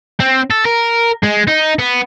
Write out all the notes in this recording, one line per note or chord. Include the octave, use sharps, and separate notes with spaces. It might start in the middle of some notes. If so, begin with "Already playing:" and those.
C4
A4
A#4
G#3
D#4
B3